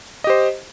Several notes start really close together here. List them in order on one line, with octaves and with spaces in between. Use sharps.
D#5 G4 C5